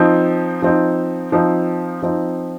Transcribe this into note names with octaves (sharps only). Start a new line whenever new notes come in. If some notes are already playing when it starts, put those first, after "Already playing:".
Already playing: F3 C4 D#4
F3 C4 D#4
F3 C4 D#4
F3 C4 D#4